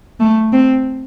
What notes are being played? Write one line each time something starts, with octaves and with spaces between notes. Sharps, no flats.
A3
C4